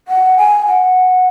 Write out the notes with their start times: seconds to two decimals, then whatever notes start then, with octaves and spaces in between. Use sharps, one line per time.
0.08 F#5
0.37 G#5
0.67 F#5